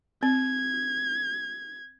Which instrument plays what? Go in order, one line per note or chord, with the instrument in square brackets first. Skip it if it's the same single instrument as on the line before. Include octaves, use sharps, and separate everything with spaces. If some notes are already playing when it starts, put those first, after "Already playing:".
[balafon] C4 [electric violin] G#6